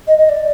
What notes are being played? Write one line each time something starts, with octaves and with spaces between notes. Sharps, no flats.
D#5
D#5
D5